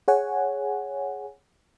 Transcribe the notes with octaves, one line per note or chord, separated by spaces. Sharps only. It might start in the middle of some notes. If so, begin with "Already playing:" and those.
G#4 C#5 F#5 G#5